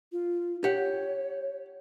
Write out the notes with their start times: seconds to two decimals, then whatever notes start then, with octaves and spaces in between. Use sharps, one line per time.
0.12 F4
0.64 G4 C#5 F#5